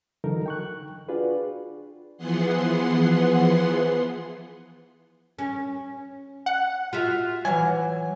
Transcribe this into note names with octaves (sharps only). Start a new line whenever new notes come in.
D3 E3 F#3 D#4 A4 A#4
G5 C#6 F#6
D4 F4 F#4 G#4 B4 D5
E3 F3 B3 G#4 F#5 C6
C#4
F#5
F4 F#4 E5
E3 F#3 G#5